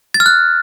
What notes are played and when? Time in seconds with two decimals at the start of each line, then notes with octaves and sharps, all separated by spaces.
0.14 A6
0.20 F6
0.26 F#6